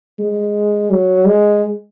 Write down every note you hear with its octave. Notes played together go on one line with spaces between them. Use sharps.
G#3
F#3
G#3